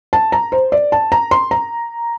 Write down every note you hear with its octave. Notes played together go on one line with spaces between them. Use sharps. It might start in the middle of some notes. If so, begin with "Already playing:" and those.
A5
A#5
C5
D5
A5
A#5
C6
A#5